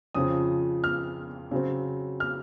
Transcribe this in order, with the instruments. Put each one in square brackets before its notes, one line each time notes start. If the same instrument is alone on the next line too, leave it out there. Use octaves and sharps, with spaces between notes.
[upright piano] F2 C#3 F3 D#6
F6
C#3 F#3 C4
F6